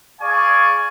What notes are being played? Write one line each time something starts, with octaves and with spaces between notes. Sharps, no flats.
G#4 D5 F5 G#5 C#6